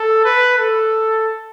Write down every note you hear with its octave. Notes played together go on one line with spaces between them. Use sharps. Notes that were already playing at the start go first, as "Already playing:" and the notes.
Already playing: A4
B4
A4